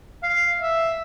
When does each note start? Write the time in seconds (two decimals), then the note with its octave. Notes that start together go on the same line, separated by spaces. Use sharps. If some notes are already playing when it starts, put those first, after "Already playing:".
0.23 F5
0.59 E5